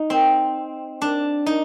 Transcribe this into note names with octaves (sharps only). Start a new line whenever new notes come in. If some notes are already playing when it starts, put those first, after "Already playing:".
Already playing: D#4
C4
D4
D#4